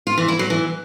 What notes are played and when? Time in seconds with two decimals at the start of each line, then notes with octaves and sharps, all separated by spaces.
0.07 F4
0.18 E3
0.28 E4
0.39 F#3
0.50 E3